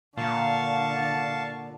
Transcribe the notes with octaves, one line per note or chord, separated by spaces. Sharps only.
A#2 D3 F5 A5 C#6